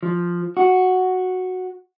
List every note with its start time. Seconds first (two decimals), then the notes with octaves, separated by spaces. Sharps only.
0.03 F3
0.57 F#4